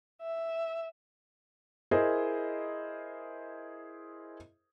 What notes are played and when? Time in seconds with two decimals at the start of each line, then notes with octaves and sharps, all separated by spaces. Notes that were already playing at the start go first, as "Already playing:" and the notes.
0.22 E5
1.91 E4 G#4 A#4 C5 D#5